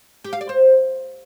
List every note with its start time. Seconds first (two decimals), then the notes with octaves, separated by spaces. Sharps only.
0.24 G4
0.33 F5
0.41 D5
0.49 C5